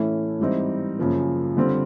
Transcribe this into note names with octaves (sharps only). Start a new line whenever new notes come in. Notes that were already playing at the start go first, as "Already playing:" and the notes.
Already playing: A2 E3 A3 C#4 E4
G#2 E3 G3 C4 D#4
F#2 C#3 F3 A#3
D3 G3 C4 F4